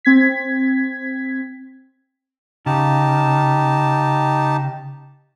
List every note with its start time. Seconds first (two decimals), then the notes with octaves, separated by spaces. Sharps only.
0.05 C4 G#6 B6
2.66 C#3 D#4 G4 A5